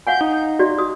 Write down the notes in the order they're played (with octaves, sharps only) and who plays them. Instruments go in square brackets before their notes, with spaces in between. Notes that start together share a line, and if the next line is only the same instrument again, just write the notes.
[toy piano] F5 F#5 G#5 [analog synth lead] G6
[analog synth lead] D#4
[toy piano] F#4 D5
F#4 D#6